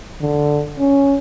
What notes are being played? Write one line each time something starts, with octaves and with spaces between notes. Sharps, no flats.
D3
C#4